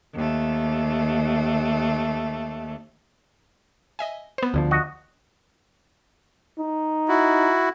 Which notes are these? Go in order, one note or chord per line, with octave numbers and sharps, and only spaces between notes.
D#2 A3
D#5 E5 G#5
B3 C5
D2 D3 F3
F#4 D#5
D#4
E4 F#4